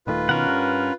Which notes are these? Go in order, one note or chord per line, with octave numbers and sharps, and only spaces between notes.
D#1 D#3 A3 F4 B4
B2 D#3 C#4 A#4 F#5
G2